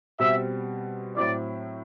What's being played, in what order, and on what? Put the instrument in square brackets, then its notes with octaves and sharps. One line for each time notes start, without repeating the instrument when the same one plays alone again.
[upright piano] B2 G3 C4 [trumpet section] E5
[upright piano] A2 F#3 C4 E4 [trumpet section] D5